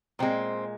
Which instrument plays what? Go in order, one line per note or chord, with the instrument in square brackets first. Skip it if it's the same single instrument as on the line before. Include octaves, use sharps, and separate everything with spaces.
[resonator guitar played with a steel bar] A#2 G#3 C4